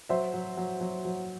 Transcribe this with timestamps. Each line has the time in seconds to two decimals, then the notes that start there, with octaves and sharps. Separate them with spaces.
0.09 F#3 C5 E5
0.34 F#3
0.57 F#3
0.81 F#3
1.05 F#3